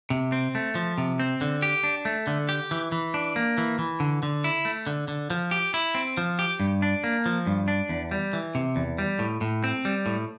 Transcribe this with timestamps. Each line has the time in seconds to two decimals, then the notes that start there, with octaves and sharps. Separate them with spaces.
0.10 C3
0.32 C4
0.55 A3
0.75 F3
0.98 C3
1.20 C4
1.41 D3
1.62 G4
1.83 D4
2.05 A3
2.27 D3
2.49 G4
2.71 E3
2.92 E3
3.14 D4
3.36 A#3
3.58 E3
3.79 E3
4.00 D3
4.23 D3
4.44 E4
4.65 A3
4.87 D3
5.08 D3
5.30 F3
5.51 G4
5.74 E4
5.95 C4
6.17 F3
6.39 G4
6.60 G2
6.82 D4
7.04 A#3
7.26 F3
7.47 G2
7.68 D4
7.89 E2
8.11 G3
8.33 E3
8.55 C3
8.76 E2
8.98 G3
9.19 A2
9.41 A2
9.64 C4
9.85 G3
10.06 A2